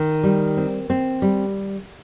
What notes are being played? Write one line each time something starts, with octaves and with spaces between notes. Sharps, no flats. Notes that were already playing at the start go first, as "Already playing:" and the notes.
Already playing: D#3
G3
C4
C4
G3